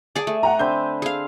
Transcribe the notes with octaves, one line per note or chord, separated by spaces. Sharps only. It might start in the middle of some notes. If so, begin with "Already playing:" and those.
G#4 D5 G#5 A5
A3
F#5 G5 A#5
D3 C4 B5 G6
G#4 F5